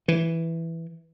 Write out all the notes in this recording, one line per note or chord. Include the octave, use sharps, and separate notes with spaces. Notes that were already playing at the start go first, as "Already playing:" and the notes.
E3